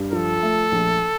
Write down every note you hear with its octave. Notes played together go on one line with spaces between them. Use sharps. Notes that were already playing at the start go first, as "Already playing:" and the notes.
Already playing: G2
F3 A4
A3
A#1